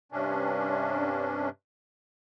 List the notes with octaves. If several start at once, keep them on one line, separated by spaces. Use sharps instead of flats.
G2 C3 C#4 D4